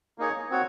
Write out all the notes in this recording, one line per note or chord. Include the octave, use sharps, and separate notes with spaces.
A#3 D#4 G#4 C#5
C4 F#4 C#5